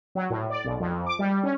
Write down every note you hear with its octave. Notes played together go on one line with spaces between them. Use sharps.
F#3
A2
D5
B1
F2
D6
G3
C#4